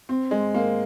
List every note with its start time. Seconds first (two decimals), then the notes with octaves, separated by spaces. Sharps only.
0.09 C4
0.31 G#3
0.54 A#3